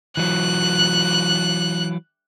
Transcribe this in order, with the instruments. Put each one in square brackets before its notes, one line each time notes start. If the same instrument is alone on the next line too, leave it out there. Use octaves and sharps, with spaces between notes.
[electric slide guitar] E3 F#3 [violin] F#6